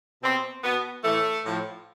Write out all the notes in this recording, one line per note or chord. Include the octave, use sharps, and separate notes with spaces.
B2 C4
B2 B3
A2 E3 A3
A2 F3